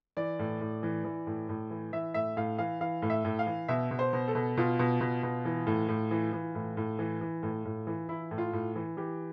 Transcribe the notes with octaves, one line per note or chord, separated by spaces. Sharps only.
E3 D5
A2
A2
E3
E3
A2
A2
E3
E3 E5
A2 E5
A2 F5
E3 F5
E3 F5
A2
E5
A2
F5
E3
B2 E5
B2
C5
B2
A4
B2
B2 F4
B2
B2
B2
E3
A2
A2
E3
E3
A2
A2
E3
E3
A2
A2
E3
E3 E4
A2
F4
A2
E3
E3 G4